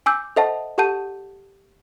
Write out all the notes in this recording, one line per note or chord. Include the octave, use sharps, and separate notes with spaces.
G#5 D6 E6 G6
A4 C5 D#5 E5 F#5 A5
G4 A4 F#5 A5 G6 D#7